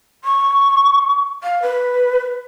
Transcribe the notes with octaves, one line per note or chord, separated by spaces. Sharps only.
C#6
F5
B4